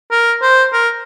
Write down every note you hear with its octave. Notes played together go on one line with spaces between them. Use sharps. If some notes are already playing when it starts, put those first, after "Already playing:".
A#4
C5
A#4